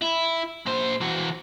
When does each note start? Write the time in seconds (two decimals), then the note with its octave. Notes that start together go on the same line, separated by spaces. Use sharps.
0.02 E4
0.66 A#2 C5
1.01 E3 F#4